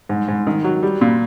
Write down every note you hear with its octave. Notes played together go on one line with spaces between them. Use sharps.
G#2
G#2
D#3
F#3
G3
A#2